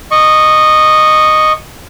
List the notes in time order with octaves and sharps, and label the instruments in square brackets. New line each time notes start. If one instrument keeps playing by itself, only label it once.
[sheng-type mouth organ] D#5 C#6